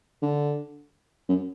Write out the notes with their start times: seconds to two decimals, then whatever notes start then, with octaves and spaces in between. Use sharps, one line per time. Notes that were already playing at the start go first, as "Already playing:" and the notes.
0.22 D3
1.29 F#2